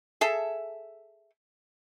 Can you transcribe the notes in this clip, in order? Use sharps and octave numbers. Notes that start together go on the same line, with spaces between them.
G#4 A4 E5